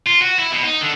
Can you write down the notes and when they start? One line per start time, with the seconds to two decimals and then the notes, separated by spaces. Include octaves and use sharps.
0.07 F4
0.22 F#4
0.39 E4
0.53 B2
0.64 D#4
0.81 D3